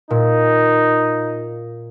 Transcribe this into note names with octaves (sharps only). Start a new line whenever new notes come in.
A#2 D#4